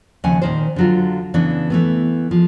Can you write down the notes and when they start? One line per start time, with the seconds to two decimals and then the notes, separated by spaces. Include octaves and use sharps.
0.24 D#2 C#3 F3 F#5 G#5
0.42 A#2 D#3 C5
0.76 D3 F#3 F4
1.34 C#3 E3 B3 D4
1.70 E3 A3 B3
2.31 F3 G#3